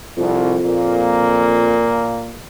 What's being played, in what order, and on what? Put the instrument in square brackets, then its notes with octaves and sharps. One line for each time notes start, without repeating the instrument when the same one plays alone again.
[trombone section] C2 [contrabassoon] F2
[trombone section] A#2 A#3